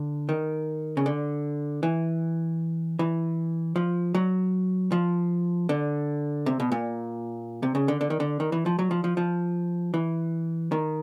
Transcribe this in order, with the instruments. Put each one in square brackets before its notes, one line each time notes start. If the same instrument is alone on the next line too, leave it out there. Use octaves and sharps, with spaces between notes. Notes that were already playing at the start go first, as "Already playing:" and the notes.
Already playing: [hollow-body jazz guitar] D3
D#3
C#3
D3
E3
E3
F3
F#3
F3
D3
C3
B2
A#2
C3
C#3
D3
D3
D#3
D3
D#3
E3
F3
F#3
F3
F3
F3
E3
D#3